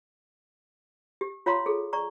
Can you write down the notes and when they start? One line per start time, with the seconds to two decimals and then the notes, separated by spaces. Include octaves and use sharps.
1.21 G4
1.46 F4 C#5 F5 A#5 C6
1.66 G#4 A4
1.93 D5 A#5 C#6